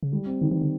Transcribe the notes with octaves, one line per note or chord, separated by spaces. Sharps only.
C#3
D3 G3
C4
D3 D#3
E3
D3